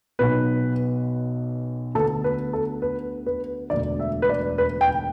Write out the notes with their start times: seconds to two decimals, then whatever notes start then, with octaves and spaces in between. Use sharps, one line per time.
0.19 B1 B2 B3 B4
1.95 D2 D3 B3 A4
2.24 B4
2.53 A4
2.82 B4
3.26 B4
3.70 E1 D2 D3 D5
4.00 E5
4.22 B4
4.29 D5
4.58 B4
4.81 G5